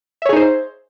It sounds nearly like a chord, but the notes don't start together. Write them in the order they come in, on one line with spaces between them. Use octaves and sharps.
E5 C#5 G#4 D#4 C5